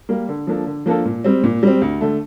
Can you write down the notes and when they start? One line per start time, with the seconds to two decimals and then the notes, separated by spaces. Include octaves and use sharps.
0.09 G3 A#3
0.29 D3
0.47 F3 A#3 D4 A4
0.66 D3
0.86 F3 A#3 D4 A4
1.05 A#2
1.24 G3 C4
1.44 A#2
1.63 G3 C4
1.81 D2
2.01 D3 A3